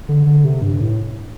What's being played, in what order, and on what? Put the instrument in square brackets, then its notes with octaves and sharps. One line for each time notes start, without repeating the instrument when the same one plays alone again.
[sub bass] D3
D3
C3
G2
A2